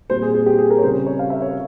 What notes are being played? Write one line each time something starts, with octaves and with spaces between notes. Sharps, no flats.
A#2 G3 C4 C5
G#4
G#4
G4
G#4
A#4
C#5
C#3 G3 C4 C5
C#5
F5
E5
C#5